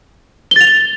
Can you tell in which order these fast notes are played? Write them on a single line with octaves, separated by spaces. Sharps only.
G7 A6 F7